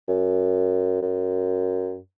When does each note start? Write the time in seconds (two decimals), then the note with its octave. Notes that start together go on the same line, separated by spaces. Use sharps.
0.08 F#2
1.02 F#2